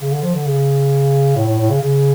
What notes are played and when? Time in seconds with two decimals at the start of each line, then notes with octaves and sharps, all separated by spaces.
0.01 C#3
0.11 D3
0.23 F3
0.34 D3
0.46 C#3
1.36 A2
1.46 A2
1.58 A2
1.70 C#3
1.80 C#3